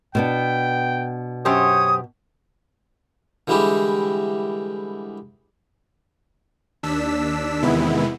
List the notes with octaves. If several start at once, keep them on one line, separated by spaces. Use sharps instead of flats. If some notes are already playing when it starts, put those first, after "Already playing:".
B2 B3 D4 G5
F#2 G4 C5 C#5 D#6
D3 E3 G3 G#3 E4 G4
D#2 D4 E6 B6
E2 C3 D#3 G#3 B3 E4